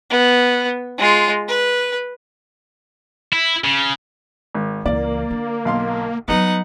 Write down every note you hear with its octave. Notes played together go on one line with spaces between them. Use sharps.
B3
G#3 F4
B4
E4
C#3
G#1
C#2 E3 A#3 D5
D3
B1 F5 C6
F#3 G3 B3 D#4 F#5